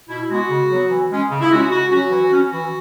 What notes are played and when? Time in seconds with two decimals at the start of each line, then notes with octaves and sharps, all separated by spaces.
0.09 B2 E4
0.30 G#3 B3 F#4
0.50 C#3
0.70 F#3 B3
0.90 E3
1.11 G#3 C#4
1.30 C#3
1.41 E4
1.51 G#3 C#4 F#4
1.70 C#3 F#4
1.90 F#3 C#4 F#4
2.11 E3
2.31 C#4
2.51 E3 F#4